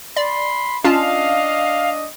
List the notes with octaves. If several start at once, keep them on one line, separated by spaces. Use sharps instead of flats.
D5 B5 C6
C#4 D4 F4 D#5 F5 A5